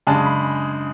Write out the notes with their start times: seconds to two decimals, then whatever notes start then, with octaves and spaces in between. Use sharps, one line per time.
0.07 F#2 C#3 G#3 D4 A5
0.26 B5